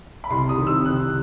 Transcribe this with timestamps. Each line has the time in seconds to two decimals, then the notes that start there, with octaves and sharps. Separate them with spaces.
0.24 B5
0.31 C2 C6
0.49 D#6
0.57 C3 D#3
0.67 E6
0.85 C2 F#6